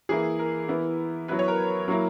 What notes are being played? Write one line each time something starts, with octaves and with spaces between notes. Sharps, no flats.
E3 A#3 E4 G#4
A#4
E3 B3 E4
F#3 B3 E4 B4
C#5
A#4
F#3 A#3 E4